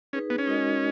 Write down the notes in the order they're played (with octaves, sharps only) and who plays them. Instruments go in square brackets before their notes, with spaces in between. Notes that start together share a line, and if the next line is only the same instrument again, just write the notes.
[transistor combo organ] C#4 [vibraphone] D#4 G#4 B4
[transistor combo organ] B3
C#4
[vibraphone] G#3 D#4 F#4 A#4 D#5